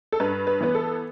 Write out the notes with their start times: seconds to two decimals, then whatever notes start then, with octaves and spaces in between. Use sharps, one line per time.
0.12 A4
0.20 G2 B4
0.47 B4
0.61 E3 B3 B4
0.75 A4